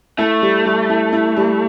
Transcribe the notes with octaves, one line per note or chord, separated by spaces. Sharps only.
A3 E4
G3
G3
E4
E4
G3